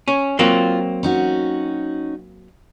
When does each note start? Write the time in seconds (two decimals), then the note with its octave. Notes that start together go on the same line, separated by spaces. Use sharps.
0.08 C#4
0.39 F#3 A#3 C4 F4
1.03 C#4 D#4 F#4